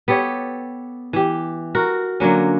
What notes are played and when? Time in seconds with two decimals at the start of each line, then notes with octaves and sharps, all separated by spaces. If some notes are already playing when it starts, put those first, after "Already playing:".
0.08 B3 G4 A4 C#5
1.13 E3 G4
1.75 F#4 A#4
2.20 D3 F#3 A#3 C#4